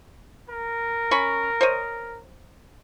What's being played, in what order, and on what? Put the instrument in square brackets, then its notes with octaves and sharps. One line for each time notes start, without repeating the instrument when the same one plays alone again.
[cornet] A#4
[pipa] C#4 B5 C#6
C5 C#5 D#5